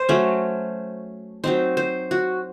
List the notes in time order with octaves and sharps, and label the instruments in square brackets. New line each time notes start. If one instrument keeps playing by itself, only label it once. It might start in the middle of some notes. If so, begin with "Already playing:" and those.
Already playing: [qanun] C5
F#3 A3 C#4
F#3 C4 D#4 C5
C5
F#4